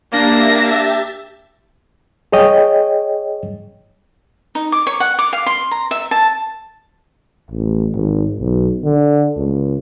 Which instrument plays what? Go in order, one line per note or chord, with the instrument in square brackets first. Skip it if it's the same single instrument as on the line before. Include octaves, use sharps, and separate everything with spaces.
[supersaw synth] A#3 [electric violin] D4 A#6 [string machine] G4 E5 A5
[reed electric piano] G#4 C#5 D#5 G5
[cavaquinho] D#4
D6
C#5
F#5
D6
F5
C6
A#5
E5
A5
[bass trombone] A1
G#1
B1
D3
C#2